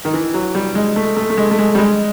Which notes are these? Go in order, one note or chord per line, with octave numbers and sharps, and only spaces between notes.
D#3
E3
F#3
G3
G#3
A3
A3
A3
G#3
A3
G#3
G3
G#3